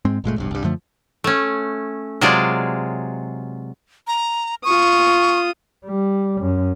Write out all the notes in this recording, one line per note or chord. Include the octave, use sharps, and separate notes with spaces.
G#2 G#3 C4
F#1 A#2 G#3 A3
F1 B1 G2
C2 G2
F#2 D3 F3 A3
A3 C#4
C3 F#3 G#3 F4 G#4 D5
A#5
F4 C#6 D#6
G3
F#2